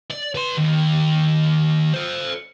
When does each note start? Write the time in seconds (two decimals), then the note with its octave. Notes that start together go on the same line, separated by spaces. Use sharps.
0.11 D5
0.35 B4 C6
0.57 D#2
1.94 A4 C5